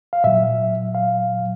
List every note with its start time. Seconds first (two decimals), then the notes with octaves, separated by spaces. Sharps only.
0.13 F5
0.24 A#2 F#3 E5
0.95 F5